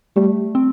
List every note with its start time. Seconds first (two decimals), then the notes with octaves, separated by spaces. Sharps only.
0.16 G3 A3
0.55 C4